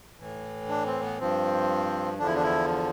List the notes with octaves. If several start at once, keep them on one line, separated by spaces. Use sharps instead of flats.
A2 E3
D4
C4
B3
G2 F3 C4
E2 D3 F3 D4
E4
D4
E4